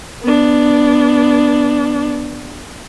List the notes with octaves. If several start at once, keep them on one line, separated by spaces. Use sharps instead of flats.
B3 D4